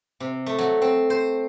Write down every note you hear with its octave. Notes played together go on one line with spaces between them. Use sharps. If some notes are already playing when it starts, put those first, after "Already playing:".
C3
A3
F#3
C4
C5